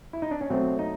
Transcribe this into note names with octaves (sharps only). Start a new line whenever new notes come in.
E4
D#4
D4
C#4
B2 F#3 A3 C4
D#4